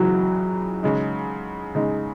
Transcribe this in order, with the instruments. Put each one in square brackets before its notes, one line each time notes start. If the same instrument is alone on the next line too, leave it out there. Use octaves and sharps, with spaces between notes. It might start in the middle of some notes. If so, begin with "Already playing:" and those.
Already playing: [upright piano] C#2 C#3 E3 [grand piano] F#3
[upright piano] C#3 G#3 D#4
C#3 G#3 D#4